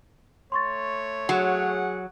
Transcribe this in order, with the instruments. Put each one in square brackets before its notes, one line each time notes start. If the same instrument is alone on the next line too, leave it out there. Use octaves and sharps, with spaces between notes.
[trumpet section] A3 C#5 [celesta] C6 C#6 A6
[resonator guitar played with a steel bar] F#3 [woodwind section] G#4 F#5